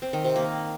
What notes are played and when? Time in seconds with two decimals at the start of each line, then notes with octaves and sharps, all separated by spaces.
0.02 C4
0.13 D#3
0.24 C3
0.36 A#3